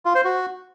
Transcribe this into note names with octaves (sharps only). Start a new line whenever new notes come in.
F4
C5
F#4